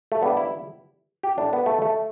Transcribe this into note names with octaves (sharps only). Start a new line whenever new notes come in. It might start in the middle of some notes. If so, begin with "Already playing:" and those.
A3
G2 G3 B3
E4
G4
A2 G3 D4
B3
A3
A3